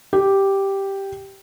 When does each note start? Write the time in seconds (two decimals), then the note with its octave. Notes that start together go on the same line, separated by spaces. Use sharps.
0.13 G4